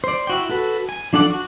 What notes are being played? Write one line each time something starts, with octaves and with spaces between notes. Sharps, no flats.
C5 D5
E4 F#4 G5
F#4 A4 B4
G#5
F3 D4 A4 F#5 D6
F#4